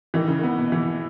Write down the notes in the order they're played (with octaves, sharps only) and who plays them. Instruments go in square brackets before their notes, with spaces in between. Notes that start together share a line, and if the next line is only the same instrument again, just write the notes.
[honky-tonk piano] D#3 [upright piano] E3
[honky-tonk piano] C#3
[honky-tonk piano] D#3 [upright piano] B3
[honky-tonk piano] B2
[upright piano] E3